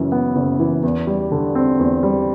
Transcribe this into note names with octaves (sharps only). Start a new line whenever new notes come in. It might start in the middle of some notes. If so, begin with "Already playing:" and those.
Already playing: F#1 F#2 E3
B3
F#1
E3
E2
G3
D3
C4
E2
G3